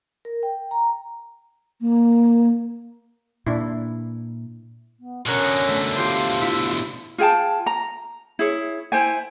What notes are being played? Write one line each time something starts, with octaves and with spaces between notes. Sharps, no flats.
A#4
G5
A#5
A#3
A#2 D4 E4
B3
B2 D3 C#4 A#4 C#5 F#6
A3
F4 G4 C5
E4
F4 G#4 G5 A5
A#5
E4 G#4 C#5
E4 C5 G5 G#5